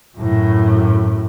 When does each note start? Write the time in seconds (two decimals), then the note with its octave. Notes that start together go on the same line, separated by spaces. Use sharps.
0.17 F#2 A2